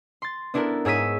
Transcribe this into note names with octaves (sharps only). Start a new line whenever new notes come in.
C6 A6
B3 D4 E4 A4 A#4
G#2 G#4 C#5 E6 B6 D#7